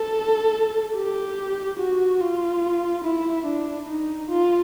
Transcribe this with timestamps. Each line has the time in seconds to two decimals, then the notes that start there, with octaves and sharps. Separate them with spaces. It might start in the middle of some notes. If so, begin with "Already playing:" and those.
Already playing: A4
0.96 G4
1.80 F#4
2.21 F4
3.04 E4
3.46 D4
3.88 D#4
4.30 F4